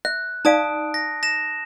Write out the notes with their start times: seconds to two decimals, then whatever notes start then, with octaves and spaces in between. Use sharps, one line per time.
0.05 E5 F#6
0.45 D#4 D5 F5 A5 D#6 D7
0.94 A#6
1.23 A#6 E7